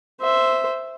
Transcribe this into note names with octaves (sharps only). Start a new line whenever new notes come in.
C5 E5